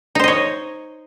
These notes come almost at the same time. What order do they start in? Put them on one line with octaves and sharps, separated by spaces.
D#4 C5 D#5 C#5